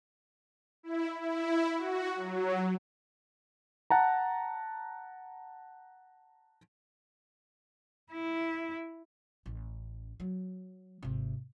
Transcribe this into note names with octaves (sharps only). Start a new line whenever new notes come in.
E4
E4
F#4
F#3
F#5 A5 A#5
E4
A1
F#3
G#1 C3